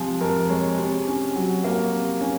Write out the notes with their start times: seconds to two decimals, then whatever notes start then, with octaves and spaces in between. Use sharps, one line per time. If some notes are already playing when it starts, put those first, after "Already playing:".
Already playing: C3 F3 G#3 G#4
0.21 F2 A#4
0.49 G#3 C#5
0.79 C3
1.07 C#4
1.36 F#3
1.64 A#3
1.93 C3
2.21 C#4